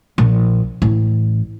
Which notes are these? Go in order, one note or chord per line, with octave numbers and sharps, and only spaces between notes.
A#1
A1